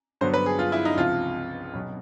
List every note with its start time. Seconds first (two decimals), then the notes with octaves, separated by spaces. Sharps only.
0.21 G2 D3 F#3 B3 C5
0.34 B4
0.46 G#4
0.59 F4
0.72 E4
0.85 D#4
0.97 C#2 C3 F3 F4
1.74 B1 B2 F#3 B3